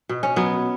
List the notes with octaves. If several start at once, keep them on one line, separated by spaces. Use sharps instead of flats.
B2
C#4
F#3 B3